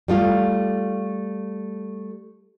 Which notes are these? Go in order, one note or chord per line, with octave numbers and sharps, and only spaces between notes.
G3 A3 F4